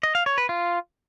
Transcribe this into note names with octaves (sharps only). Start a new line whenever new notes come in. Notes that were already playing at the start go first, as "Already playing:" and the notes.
D#5
F5
C#5
B4
F4